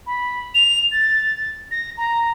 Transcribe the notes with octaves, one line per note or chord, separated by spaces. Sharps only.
B5
F7
A6
A#6
A#5